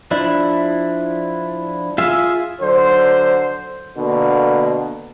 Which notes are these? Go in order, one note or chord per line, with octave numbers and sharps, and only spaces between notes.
F3 D4 E4
F4 G#4 E5
D3 F#3 C5
B2 D3 A#3